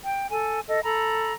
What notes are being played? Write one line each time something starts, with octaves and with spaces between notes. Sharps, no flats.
G5
A4 G#5
A4 D#5
A4 A#5 B5